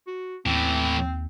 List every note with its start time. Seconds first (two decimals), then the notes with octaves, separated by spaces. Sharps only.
0.07 F#4
0.46 D#2 A2 E3 C4